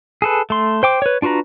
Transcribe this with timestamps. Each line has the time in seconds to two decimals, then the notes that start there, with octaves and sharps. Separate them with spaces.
0.22 G#4 A4 B4
0.50 A3 C6
0.83 C5 G5 D6
1.02 B4 C#5
1.22 D4 F4 F#4 B4 A#5